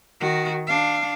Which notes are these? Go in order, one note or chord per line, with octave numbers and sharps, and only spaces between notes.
D#3 F#4
D4 F5